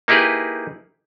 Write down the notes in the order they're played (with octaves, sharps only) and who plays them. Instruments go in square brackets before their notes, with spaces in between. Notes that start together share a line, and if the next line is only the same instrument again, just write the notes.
[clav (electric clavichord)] A#3 D#4 E4 G4 G#4 B4